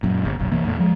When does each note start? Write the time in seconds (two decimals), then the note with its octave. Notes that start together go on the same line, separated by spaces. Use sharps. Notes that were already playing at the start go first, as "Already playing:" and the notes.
0.03 F#2 A#2
0.25 G1
0.39 F#1 B1
0.52 C2 E3 A#3
0.64 E2 A2 A3
0.79 F3 G#3